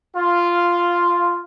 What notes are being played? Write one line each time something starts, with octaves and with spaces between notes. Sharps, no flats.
F4